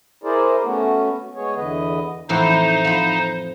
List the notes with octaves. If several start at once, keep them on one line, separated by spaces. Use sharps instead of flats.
E4 G#4 A#4 C5 D5
A3 B3 C#4 F#4
G#3 B3 G#4 C#5
E2 D3 E3 B4 D#5
F2 A2 E3 D#4 C5
F3 B5